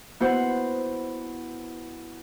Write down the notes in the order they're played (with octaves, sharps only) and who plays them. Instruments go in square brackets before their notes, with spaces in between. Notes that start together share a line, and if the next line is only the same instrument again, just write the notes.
[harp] B3 E4 F#4 C5 F#5